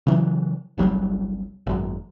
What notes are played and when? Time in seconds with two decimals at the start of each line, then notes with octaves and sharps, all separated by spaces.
0.07 C#3 E3 F#3
0.78 G1 C2 F#3 G3
1.67 G#1 F#2